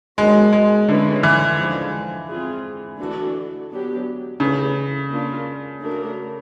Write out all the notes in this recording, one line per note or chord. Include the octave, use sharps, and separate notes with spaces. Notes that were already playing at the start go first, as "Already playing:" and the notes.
D#3 F#3 G#3 B3 D4 F#4
G#3
D3 A3 C#4 E4 G#4 B4
E3
D3 F3 G#3
C4 F4 G#4
E3 A3 D4 F#4 A4
F#3 B3 D4 G4
C#3 E3 A3 D4 G4
A#3 D4 F4
A3 D4 F#4 A#4